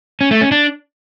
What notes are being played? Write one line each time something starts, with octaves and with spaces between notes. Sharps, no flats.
C#4
A3
C#4
D4